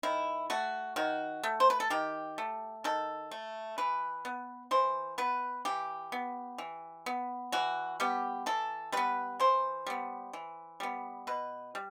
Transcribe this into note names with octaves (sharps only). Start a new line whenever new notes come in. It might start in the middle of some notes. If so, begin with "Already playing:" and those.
D#3 E4
A3 F#4
D#3 F#4
A3
C5
B4
A4
D#3 G4
A3
D#3 A4
A3
E3 B4
B3
E3 C5
B3 B4
E3 G4
B3
E3
B3
E3 F#4
G3 B3 G4
E3 A4
G3 B3 B4
E3 C5
G3 B3
E3
G3 B3
B2 B4
G3